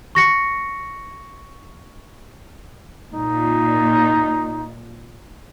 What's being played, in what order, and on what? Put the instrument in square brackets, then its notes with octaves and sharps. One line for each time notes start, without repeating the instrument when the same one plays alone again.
[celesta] C#6 A#6 C#7
[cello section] A#2 [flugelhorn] D#4